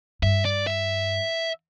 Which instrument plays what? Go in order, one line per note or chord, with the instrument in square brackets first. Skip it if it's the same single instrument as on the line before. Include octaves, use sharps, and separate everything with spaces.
[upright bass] G2 [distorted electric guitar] E5
[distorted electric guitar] D5
E5